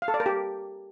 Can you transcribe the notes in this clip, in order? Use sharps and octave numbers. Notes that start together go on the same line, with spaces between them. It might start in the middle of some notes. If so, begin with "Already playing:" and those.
F5
A4
D5
A#4
G4